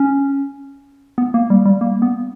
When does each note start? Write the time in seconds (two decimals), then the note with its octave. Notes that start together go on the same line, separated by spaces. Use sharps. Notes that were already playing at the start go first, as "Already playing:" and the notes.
Already playing: C#4
1.18 B3
1.34 A#3
1.50 G3
1.65 G3
1.81 A#3
2.02 B3